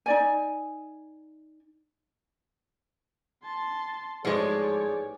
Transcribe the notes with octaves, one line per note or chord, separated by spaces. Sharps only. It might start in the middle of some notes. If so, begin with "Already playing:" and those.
D#4 D5 G#5
A5 C6
A1 G#2 F3 G#3 G#4 C#5 D5 C#6